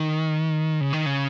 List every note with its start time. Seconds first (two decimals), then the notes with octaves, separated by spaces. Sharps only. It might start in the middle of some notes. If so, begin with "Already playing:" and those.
Already playing: D#3
0.80 C#3
0.93 D#3
1.06 C#3